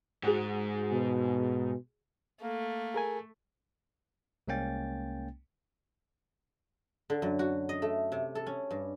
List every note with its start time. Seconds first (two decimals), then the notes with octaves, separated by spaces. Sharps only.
0.23 G#2 F#4 G#4
0.92 B2
2.42 A3 A#3
2.94 G#4 A#4 G#5
4.48 C2 G#3 A#3 C#4 G5 A6
7.10 D3
7.22 F#2
7.39 F#4
7.69 D#5
7.82 A3
8.12 C3
8.35 A4
8.46 C#4
8.71 G2